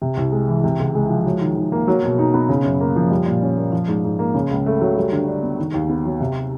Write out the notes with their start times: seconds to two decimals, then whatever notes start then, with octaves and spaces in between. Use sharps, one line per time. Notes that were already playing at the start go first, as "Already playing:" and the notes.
0.02 C3
0.17 C2
0.32 G#3
0.48 E3
0.64 C3
0.79 C#2
0.95 G#3
1.10 F3
1.26 F#3
1.41 D#3
1.56 D#3
1.72 A#3
1.88 F#3
2.03 B2
2.18 D#4
2.34 B3
2.49 C#3
2.64 F#2
2.80 A#3
2.96 F3
3.11 G3
3.26 A#2
3.42 C#4
3.57 A#3
3.72 F3
3.88 G#2
4.04 G#2
4.19 A#3
4.34 C#3
4.51 C#2
4.66 A3
4.81 F#3
4.97 G3
5.12 D3
5.27 D4
5.43 B3
5.58 D#3
5.74 D#2
5.90 B3
6.05 F#3
6.20 C3